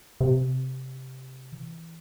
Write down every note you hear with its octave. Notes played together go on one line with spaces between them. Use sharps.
C3
E3